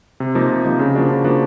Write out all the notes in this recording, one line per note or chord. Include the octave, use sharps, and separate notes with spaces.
C3
F3 A#3 D#4
C3
F3 A#3 D#4
C#3
F3 A#3 D4 F#4
C#3
F3 A#3 D4 F#4